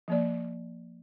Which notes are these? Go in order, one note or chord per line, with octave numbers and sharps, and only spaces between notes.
F3 A#3 D5